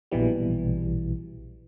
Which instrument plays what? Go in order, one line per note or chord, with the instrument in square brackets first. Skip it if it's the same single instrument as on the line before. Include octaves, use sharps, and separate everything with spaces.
[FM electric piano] A#1 B2 E3 G3